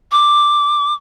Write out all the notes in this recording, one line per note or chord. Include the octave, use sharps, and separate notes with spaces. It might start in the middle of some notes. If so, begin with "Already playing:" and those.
D6